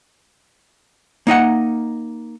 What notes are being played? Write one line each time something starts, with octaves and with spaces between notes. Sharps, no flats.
A#3 D#4 D#5 F#5